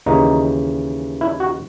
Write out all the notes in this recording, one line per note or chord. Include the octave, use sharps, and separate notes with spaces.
D#2 C#3 E3 D#4
E4
F#4